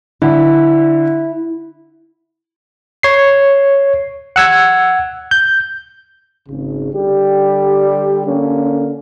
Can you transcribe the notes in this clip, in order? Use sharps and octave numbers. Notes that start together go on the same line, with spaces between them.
D3 E4
C#5 C7
F#5 E6 G#6
G6
G#1 C#3
D3 G3 G4
D3 A#3 C#4